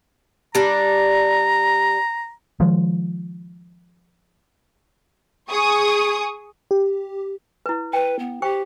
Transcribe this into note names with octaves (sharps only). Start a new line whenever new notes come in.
G3 D4 A#5
D#3 F3 G#3
G#4 C#6 D#6
G4
E4 B4
B4 G5
B3
G4 C5 G5 C#6